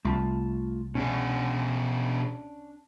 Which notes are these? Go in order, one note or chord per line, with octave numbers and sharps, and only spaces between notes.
C2 A3 F4 A5
B2 C#4 D4 G#4